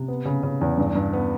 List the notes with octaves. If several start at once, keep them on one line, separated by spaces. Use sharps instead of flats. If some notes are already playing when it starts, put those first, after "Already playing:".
Already playing: C3
B3
C#3
C#3
E2
G2
G2
B3